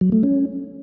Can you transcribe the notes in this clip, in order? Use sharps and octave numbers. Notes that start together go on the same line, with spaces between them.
F#3
A3
C#4